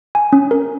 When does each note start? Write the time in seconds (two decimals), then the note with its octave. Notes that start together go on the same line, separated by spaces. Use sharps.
0.15 G#5
0.33 C#4
0.51 A#4